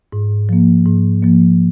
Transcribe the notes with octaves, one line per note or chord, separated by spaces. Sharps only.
G#2
F3 A#3
G#2
F3 A#3